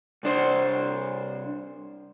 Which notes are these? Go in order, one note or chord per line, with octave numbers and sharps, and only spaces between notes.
C2 D4 C5